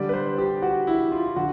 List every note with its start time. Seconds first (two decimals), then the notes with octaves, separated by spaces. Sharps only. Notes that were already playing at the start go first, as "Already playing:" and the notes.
Already playing: D3 G3 D5
0.09 B4
0.14 C5
0.38 G4
0.62 F#4
0.87 E4
1.12 F4
1.36 D3 F#4